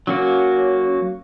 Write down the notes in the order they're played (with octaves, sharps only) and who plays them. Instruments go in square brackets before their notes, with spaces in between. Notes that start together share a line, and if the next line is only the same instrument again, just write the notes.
[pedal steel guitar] F#3 A#3 F#4 [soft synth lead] C#4